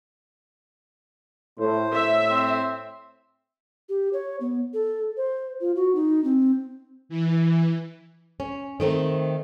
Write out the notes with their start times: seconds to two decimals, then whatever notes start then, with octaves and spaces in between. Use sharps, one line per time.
1.59 A2 C5
1.93 A2 E5
2.30 C4
3.89 G4
4.13 C#5
4.40 B3
4.74 A4
5.17 C5
5.61 F4
5.76 F#4
5.95 D#4
6.24 C4
7.09 E3
8.40 C#4
8.80 D#3 A3 C4 D#4